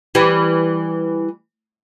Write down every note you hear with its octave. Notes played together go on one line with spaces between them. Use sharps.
E3 G3